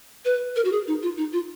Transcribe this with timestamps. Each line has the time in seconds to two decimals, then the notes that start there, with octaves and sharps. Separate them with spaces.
0.25 B4
0.56 A#4
0.65 F#4
0.72 G#4
0.87 D#4
1.03 F4
1.18 D#4
1.33 F4